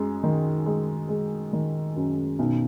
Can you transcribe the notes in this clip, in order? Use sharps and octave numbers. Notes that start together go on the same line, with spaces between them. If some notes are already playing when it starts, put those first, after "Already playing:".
Already playing: F#2 G#3
D#3
G#3
G#3
D#3
F#2
B1